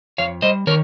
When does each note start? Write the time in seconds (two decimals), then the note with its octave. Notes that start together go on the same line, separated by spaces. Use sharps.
0.18 F2 C#5 F5
0.42 G3 C5 D#5
0.67 D#3 A#4 C#5